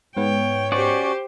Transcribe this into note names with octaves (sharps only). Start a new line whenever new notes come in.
G#2 B3 C#5 G5
C#4 F#4 G4 C5 D5